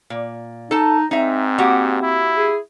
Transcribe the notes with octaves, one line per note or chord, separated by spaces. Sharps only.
A#2
D#4 A4 A5
G#2 C4 D#4 E5
A#3 F#4 G4
E4
G#4